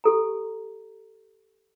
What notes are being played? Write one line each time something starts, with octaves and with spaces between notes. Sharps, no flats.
G4 A4 A#5